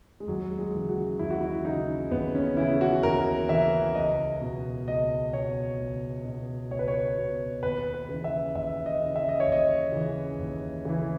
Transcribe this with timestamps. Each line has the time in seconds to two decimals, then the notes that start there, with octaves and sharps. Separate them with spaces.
0.20 G#3
0.27 D#2 F#3
0.59 G#3
0.74 C#3 E3
0.89 F#4
1.19 D#2 E4
1.30 F#4
1.41 E4
1.65 C#3 E3 D#4
2.11 D#2 B3
2.35 C#4
2.57 C#3 E3 E4
2.81 F#4
3.03 D#2 A#4
3.49 C#3 E3 E5
3.95 C#2 D#5
4.41 B2
4.88 C#2 D#5
5.33 B2 C#5
5.80 C#2
6.25 B2
6.71 C#2 C#5
6.79 B4
6.88 C#5
7.17 B2
7.63 D#2 B4
7.94 B4
8.09 C#3 E3
8.24 E5
8.55 D#2 E5
8.86 D#5
9.01 C#3 E3
9.16 E5
9.29 D#5
9.40 C#5
9.47 D#2
9.52 D#5
9.92 C#3 E3
10.39 D#2
10.85 C#3 E3